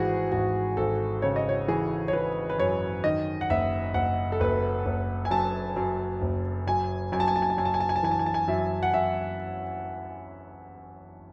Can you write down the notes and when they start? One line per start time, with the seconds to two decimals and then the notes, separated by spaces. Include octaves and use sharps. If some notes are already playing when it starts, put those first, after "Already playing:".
Already playing: G#1 E3 F#4 G#4
0.32 G#1 F#4
0.77 G#1 A4
1.22 C#3 C#5
1.36 D#5
1.49 C#5
1.68 E3 G#4
2.08 C#5
2.13 E3 B4
2.50 B4
2.59 F#2 C#5
3.04 D#3 D#5
3.41 F#5
3.50 F#1 E5
3.94 F#1 F#5
4.32 A4
4.40 F#1 B4
4.86 F#1
5.25 G#5
5.30 F#2 A5
5.76 F#2
6.22 F#1
6.67 F#2 G#5
7.12 F#2 G#5
7.20 A5
7.28 G#5
7.36 A5
7.42 G#5
7.50 A5
7.58 F#2 G#5
7.65 A5
7.74 G#5
7.80 A5
7.89 G#5
7.96 A5
8.03 E3 G#5
8.11 A5
8.19 G#5
8.26 A5
8.34 G#5
8.48 F#2 E5
8.83 F#5
8.94 F#2 E5